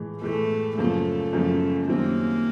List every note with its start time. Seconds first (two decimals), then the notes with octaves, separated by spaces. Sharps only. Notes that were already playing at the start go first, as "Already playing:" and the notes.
Already playing: A2 E3 G#3
0.22 A2 E3 G#3 A3
0.78 F#2 C#3 F3 A3 A#3
1.33 F#2 C#3 F3 A#3
1.88 F#2 D#3 G3 A#3 C4